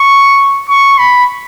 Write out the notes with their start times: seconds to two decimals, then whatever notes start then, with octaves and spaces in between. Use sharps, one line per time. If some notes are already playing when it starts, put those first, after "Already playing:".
Already playing: C#6
0.69 C#6
0.98 B5